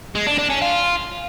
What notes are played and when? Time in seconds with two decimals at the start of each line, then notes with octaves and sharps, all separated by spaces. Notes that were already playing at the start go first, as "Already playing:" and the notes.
0.15 G#3
0.27 D4
0.38 D4
0.50 C#4
0.62 F4